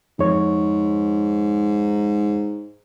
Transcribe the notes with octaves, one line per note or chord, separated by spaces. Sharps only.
F2 G#2 C#5